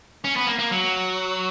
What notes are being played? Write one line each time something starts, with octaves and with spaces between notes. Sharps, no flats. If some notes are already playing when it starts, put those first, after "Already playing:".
C#4
B3
A#3
A#3
F#3